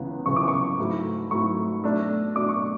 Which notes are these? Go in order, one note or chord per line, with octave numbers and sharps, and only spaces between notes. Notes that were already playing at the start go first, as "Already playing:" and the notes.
Already playing: C#2 C#3 E3 B3
C#2 C#3 E3 B3 C#6
D6
C#6
G#2 F#3 A3 E4
G#2 F#3 A3 E4 C#6
B2 A3 D4
B2 A3 D4 D6
C#6